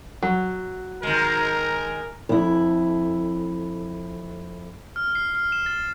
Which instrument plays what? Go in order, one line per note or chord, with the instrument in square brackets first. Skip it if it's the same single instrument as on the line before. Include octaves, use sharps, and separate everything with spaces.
[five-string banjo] F#3
[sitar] D#3 G#3 [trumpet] A#4
[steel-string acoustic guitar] F2 E4
[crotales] F6
C7
F6
E7
A6